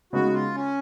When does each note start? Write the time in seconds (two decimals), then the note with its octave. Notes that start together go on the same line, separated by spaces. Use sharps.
0.13 C#3 G#3 B3 D#4 F#4
0.34 F4
0.55 C#4